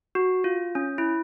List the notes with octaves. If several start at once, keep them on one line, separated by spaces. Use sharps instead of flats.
F#4
F4
C#4
E4